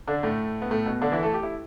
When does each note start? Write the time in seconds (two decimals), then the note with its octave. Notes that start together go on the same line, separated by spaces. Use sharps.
0.07 D3 D4
0.23 A2 A3
0.62 B3
0.71 A2 A3
0.86 B2 B3
1.02 D3 D4
1.12 E3 E4
1.23 A3 A4
1.34 G4
1.43 E4